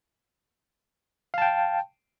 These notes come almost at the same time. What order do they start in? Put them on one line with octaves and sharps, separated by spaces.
F5 A5 G5